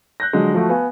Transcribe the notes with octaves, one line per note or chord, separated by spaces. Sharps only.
F#6 G6 A#6
D3 F3 F#3 G#3
F3 A3 F#4
B3 F5 G#5